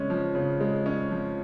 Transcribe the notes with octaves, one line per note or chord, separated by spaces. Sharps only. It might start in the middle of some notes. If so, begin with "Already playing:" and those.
Already playing: C#3 G#3 C#4
F3
C#3
G#3
C#4
F3